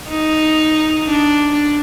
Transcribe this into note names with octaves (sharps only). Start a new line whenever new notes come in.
D#4
D4